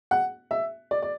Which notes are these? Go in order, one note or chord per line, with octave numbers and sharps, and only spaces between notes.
F#5
E5
D5
D5